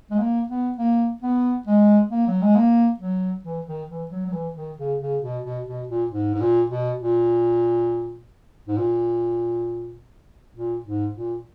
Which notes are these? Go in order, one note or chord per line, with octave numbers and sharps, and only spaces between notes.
G#3
A#3
B3
A#3
B3
G#3
A#3
F#3
G#3
A#3
F#3
E3
D#3
E3
F#3
F#3
E3
D#3
C#3
C#3
B2
B2
B2
A#2
G#2
G#2
A#2
B2
A#2
G#2
A#2
A#2
G#2
A#2